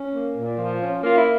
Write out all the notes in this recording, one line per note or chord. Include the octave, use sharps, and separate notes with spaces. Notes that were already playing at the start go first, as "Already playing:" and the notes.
Already playing: C#4
A#3
A#2
F3
C#4
A#3 F4
E4